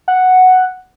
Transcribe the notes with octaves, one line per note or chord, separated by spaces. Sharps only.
F#5